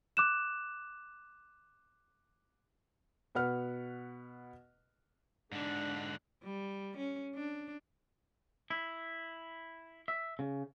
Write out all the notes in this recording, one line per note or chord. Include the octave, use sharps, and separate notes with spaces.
D6 F#6 E7
B2 B4 F#5 F6
G#2 D3 D4 F#5
G3
C#4
D4
E4
E5
C#3